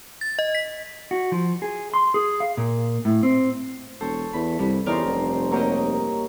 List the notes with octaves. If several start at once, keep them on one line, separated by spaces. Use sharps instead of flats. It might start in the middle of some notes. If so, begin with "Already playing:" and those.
A6
D#5
B6
F#4
F3
G#4
C6
G#4
F5
A#2
A2
C4
E1 A4 C5 C#5
E2 B5
C2 G2
E2 C#4 D#4 A#4 C5 D5 F6
F1
F#3 A#3 G4 A#4 C#5 D#5